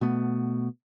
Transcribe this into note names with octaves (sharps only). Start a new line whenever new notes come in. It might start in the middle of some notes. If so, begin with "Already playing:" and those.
B2 A3 B3